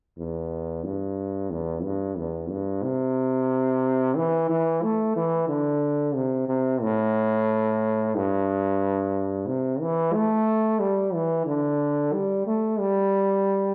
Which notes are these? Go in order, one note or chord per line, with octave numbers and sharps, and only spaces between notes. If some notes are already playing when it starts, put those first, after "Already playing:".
E2
G2
E2
G2
E2
G2
C3
E3
E3
A3
E3
D3
C3
C3
A2
G2
C3
E3
A3
G3
E3
D3
G3
A3
G3